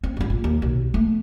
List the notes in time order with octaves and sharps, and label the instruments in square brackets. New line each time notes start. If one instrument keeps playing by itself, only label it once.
[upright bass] C4
G#1 G2
A#2
D#2
B1
A3 B3